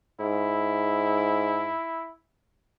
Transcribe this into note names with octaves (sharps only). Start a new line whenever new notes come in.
G#2 E4